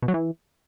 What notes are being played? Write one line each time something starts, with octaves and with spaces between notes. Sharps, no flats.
B2
F#3
E3